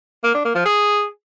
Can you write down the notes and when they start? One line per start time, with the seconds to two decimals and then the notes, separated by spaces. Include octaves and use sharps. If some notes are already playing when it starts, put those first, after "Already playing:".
0.24 A#3
0.34 D4
0.45 A#3
0.55 F3
0.66 G#4